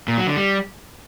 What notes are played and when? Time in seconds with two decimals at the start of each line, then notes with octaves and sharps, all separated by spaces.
0.08 A#2
0.17 F#3
0.27 D3
0.36 G3